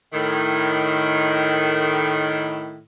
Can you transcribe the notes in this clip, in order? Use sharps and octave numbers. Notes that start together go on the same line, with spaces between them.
A2 D#3